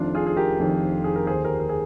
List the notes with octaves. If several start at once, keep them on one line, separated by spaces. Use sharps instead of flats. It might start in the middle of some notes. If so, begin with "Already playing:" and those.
Already playing: F1 F2 D#3 D4 F4
F4 G#4
G#4
G4 A#4
F1 F2 D#3
G#4
A#4
D#2 D3 G#4 C5
G4 A#4
A#4
G#4